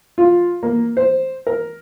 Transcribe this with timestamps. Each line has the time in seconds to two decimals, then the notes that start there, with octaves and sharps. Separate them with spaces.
0.18 F4
0.63 A#3
0.97 C5
1.47 A#4